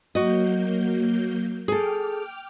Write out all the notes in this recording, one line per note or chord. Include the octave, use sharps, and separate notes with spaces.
F#3 A#3 F#4 D#5 G6
G#4 A4 G5 D6 F6